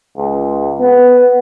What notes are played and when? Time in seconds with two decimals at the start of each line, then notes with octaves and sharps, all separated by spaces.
0.17 C#2
0.80 B3